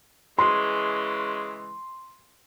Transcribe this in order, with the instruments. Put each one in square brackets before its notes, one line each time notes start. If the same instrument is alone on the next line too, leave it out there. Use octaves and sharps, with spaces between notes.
[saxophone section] C#3 E3 G#3 [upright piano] C6